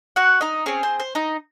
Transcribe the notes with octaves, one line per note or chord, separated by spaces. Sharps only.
F#4 F#5
D#4 D#5
C4 C#4 G#4 C#5
C5
C5
D#4 D#5